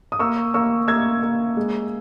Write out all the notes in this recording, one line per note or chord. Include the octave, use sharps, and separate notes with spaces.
D#6
A#3 C#6 E6
A#3 C#6 E6
A#3 E6 G#6
A#3
G#3